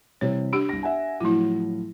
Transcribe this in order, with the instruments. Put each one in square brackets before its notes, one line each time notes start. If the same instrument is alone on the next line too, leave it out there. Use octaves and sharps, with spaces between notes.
[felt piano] C3 E3 G3 [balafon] C#5
[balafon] D4 G4 [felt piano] D7
[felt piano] C2 A#6
E5 F#5 G#5
[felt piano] A2 F3 F#3 [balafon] E4 F4